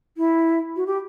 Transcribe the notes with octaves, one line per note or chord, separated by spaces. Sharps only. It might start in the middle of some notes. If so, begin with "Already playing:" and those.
E4
F#4
G4